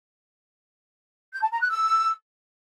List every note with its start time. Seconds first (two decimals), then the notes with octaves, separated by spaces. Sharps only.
1.33 G6
1.42 A5
1.51 A#5
1.61 F#6
1.70 E6